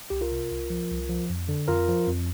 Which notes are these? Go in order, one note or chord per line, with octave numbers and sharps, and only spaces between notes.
C2 G4
F4 A#4
C3
C2
F3
C2
F3
F2
D3
F2 F4 A#4
F3
F2